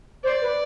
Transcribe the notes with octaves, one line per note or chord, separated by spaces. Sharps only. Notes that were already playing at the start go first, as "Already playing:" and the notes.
C5 D5
B4